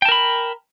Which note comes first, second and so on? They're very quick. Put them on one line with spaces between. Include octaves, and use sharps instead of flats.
G5 A5 A#4 B5